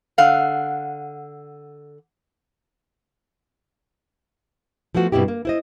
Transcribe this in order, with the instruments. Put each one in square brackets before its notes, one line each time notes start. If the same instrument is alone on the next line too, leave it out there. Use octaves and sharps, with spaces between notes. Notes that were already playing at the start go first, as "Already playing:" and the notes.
[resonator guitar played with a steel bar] D3 F5 F#5
[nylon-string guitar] F3 A3 B3 F#4
G2 B2 C4 E4 G4
A#3
E4 C5 D#5